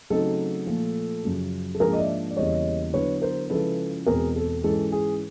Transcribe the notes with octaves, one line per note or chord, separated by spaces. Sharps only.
C#3 F#3 A3 C4 D#4 A4
A#2 F3 A3
F#2 C#3 F3
A4
G#2 F3 A#3 D4 G#4 A#4
D#5
D5 E5
D5
E2 C#3 E3 G3 A#3 C#5 D#5
D3 F#3 B3 E4 B4 C#5
A#4 C5
C#3 F3 G#3 C#4 E4 A4 B4
E2 B2 G#3 C4 G#4 A#4
A4
G#2 E3 G#3 C#4 A4
G#4